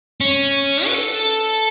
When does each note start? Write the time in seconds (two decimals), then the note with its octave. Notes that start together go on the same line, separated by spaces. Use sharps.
0.21 C#4
0.86 B4
0.94 A4